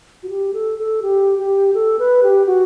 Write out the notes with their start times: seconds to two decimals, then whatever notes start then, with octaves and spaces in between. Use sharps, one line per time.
0.23 F#4
0.29 G4
0.54 A4
0.79 A4
1.02 G4
1.39 G4
1.74 A4
1.99 B4
2.23 G4
2.47 F#4